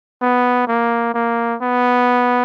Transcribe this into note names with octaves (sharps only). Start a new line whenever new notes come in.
B3
A#3
A#3
B3